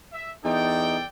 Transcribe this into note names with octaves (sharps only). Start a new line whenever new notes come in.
E5
E2 D#4 A4 D5 G5